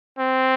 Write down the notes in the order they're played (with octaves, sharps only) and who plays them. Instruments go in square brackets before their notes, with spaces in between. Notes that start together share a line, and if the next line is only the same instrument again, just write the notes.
[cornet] C4